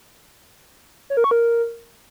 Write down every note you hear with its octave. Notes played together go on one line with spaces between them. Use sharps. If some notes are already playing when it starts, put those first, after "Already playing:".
C#5
A#4
C#6
A#4